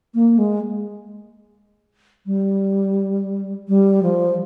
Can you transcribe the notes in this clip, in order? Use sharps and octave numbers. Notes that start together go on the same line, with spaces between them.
A#3
G#3
G3
G3
F3